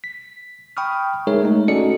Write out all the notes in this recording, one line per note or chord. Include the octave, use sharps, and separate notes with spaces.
B6
G5 B5 C#6 D#6 F6
G#3 D#4 G#4 A#4 C#5 E5
G#3 A3 D#4
C#4 F#4 A4 D5 D#5 C#7